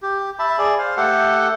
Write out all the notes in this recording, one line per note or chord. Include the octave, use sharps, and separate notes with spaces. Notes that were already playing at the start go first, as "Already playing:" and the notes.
G4
E5 A5 B5
G#4 D5
C5 F5
A3 G4 A4 F#5